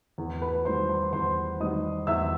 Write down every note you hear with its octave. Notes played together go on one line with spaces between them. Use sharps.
E2
B4 B5
D#3 G3 C5 C6
C5 C6
E2 C5 C6
D#3 G3 D#5 D#6
E2 E5 E6